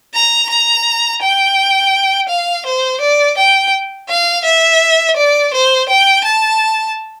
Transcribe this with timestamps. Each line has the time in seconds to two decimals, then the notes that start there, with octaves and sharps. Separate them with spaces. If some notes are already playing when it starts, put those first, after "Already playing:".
0.14 A#5
0.49 A#5
1.22 G5
2.29 F5
2.66 C5
3.01 D5
3.38 G5
4.08 F5
4.44 E5
5.16 D5
5.53 C5
5.89 G5
6.24 A5